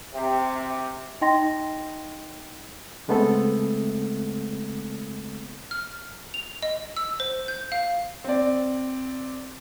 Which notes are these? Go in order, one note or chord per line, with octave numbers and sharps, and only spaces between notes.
C3
D#4 D#5 G5 C6 A#6
C#3 G#3 A3 B3 C4 A4
F6
F7
D#5
E6
C5
G6
F5
C4 D5